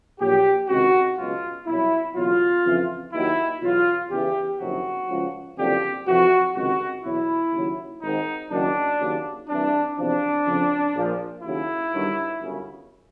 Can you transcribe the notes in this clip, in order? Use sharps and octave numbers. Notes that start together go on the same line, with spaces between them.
A#1 A#2 F#3 G4
C#2 C3 D#3 F#4
C#2 B2 F#3 F4
C2 B2 F#3 E4
F#1 E2 B2 F#3 F4
F2 C#3 E3
D#2 D#3 F#3 E4
E2 B2 F#3 F4
E2 C#3 E3 G4
F#1 F2 C3 D#3 F#3 F#4
C#2 C#3 F3
F#1 F2 D3 F3 G4
F2 C3 E3 F#4
C#2 C3 D#3 F#3 F#4
E2 B2 F#3 E4
D#2 C#3 F#3
G#1 G#2 D#3 D#4
F#1 F#2 D#3 F#3 D4
D#2 C#3 F#3
C2 C3 E3 D4
E2 C3 F3 D4
F2 C#3 F3
A#1 A#2 F3
D#2 C#3 F#3 E4
G1 G2 D#3 F#3
G1 F#2 C#3